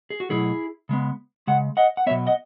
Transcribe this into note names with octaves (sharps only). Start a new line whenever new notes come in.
G#4
F#4
B2 F#3 A3 E4 G#4
C#3 G#3 B3
C#3 G#3 F#5
D#5 F#5
F#5
B2 F#3 B3 C#5 E5
D#5 F#5